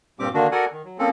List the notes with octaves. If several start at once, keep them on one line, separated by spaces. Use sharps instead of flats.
G2 A#2 G3 C4 G4 D6
D3 D#3 A#3 D4 F#4
F#4 A4 A#4 D5 F#5 G#5
D#3
F#3
F3 A#3 C4 C#4 A4